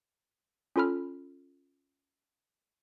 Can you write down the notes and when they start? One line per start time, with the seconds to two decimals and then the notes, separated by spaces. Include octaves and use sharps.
0.76 C#4 F4 A4 B5 F6